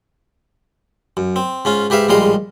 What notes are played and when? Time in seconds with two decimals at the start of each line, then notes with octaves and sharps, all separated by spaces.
1.17 F#2
1.36 C4
1.65 G#2 C#4 F4
1.90 G#2 G4 B4 E5 F5
2.08 A#1 A2 G3 G#3 D#5 F5